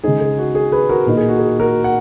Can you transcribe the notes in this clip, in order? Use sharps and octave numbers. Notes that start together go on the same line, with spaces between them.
C#3 G#3 D#4 G#4
G#4
F#4
G#4
G#4 B4
F#4 A#4
A#2 A#3 D#4 A#4
G#4
F#4
G#4
F#4 A#4
F#5